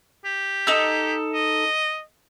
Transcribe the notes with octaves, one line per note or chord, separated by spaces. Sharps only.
G4
D#4 A4 E6
D#5